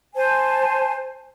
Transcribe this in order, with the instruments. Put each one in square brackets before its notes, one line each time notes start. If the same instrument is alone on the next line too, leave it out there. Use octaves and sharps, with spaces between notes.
[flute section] C5 G#5 A5